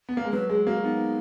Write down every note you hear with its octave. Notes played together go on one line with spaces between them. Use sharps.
B3
A#3
G#3
F#3 B4
G#3 G#4
A#3 F#4
B3 D#4